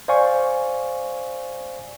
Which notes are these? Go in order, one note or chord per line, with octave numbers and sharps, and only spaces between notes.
C5 D5 F5 G#5 C#6